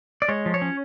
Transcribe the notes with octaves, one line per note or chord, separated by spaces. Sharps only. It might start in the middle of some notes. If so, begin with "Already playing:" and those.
D5
G#3 C#5
F3
C#5
C#4